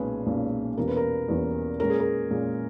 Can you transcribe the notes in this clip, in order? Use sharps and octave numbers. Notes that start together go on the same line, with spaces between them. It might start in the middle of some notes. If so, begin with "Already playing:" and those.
Already playing: B1 A#2 G#3 C#4 G#4 B4
B1 A#2 G#3 C#4 G#4
E2 B2 G3 A#3 C#4 A#4
B4
A#4
E2 B2 G3 A#3 C#4
A#2 G#3 C#4 A#4
G#4
A#4
A#2 G#3 C#4